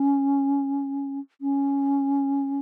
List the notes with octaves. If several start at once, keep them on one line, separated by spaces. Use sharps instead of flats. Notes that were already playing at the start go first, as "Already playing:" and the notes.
Already playing: C#4
C#4